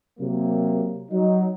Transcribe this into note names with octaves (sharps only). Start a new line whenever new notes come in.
C3 F#3 A#3
F#3 D#4